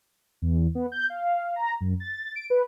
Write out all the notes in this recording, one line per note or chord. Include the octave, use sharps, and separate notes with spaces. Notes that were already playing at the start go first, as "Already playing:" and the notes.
E2
B3
G6
F5
A#5
F#2
A6
D7
B4